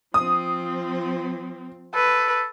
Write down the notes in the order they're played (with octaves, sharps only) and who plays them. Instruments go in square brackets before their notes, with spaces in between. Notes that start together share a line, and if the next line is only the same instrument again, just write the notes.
[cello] F3 C4 [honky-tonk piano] D#6
[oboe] A4 [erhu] B4